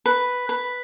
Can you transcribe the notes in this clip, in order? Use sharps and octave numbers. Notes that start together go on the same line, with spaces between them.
B4
B4